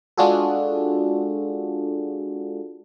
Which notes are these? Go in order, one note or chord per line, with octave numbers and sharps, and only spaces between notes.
G#3 D4 F4 F#4 G#4 A4